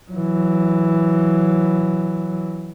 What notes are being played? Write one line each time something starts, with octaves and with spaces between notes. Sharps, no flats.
E3 F#3